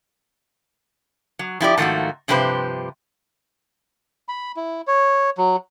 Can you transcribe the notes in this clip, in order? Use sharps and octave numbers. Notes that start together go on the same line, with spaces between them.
F#3
F3 E4 G4 D5
G#2 D#3 F3 A3 A#3 F#4
G2 C3 F3 G4 B4 C5
B5
E4
C#5
F#3